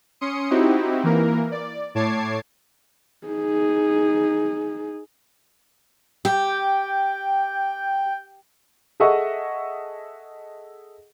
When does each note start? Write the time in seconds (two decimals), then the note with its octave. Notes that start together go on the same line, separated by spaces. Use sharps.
0.21 C#4 C6 D#6 C#7
0.50 C4 D#4 E4 F#4 G4
1.04 E3 A#3 A#4
1.52 D5
1.95 A2 C#5 A5 D6 G#6 C7
3.27 D#4 G#4
6.25 G4 G5
9.00 G#4 A4 D#5 E5 F#5 C#6